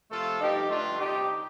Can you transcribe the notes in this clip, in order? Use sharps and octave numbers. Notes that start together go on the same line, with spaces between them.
C3 F3 A3 F4 A4
G2 F3 A3 D#4 G4
G2 D3 A3 D4 F4
C3 G3 D#4 G4